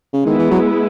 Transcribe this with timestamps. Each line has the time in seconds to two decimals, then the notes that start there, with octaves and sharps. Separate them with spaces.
0.13 C#3
0.26 D#3 G#3 B3 E4
0.39 E3
0.51 F#3